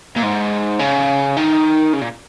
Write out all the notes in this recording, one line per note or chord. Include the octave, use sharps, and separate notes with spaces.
A#2
G#2
C#3
D#3
C#3
A#2